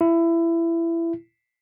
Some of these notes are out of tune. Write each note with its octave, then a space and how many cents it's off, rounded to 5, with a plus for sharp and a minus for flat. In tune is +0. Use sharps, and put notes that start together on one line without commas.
E4 +20